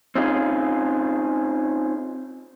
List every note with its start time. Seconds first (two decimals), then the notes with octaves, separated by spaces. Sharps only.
0.15 C4 C#4 D#4 F4 G#4